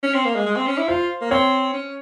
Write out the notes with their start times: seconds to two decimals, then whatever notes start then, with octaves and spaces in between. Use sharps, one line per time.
0.03 C#4
0.14 C4
0.25 A#3
0.36 G#3
0.46 G#3
0.56 C4
0.67 C#4
0.78 E4
0.88 F4 C5
1.21 A#3
1.31 C4 C#5
1.74 C#4